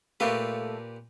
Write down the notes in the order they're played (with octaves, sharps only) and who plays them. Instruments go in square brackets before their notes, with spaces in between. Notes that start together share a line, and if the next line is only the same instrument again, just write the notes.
[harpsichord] A#2 G4 B4 [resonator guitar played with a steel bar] A3 A4 F5